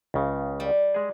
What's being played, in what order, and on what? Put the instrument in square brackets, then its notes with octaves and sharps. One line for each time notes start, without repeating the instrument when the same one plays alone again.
[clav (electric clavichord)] C#2 C#3
[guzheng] G3
[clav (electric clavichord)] G#3 G#4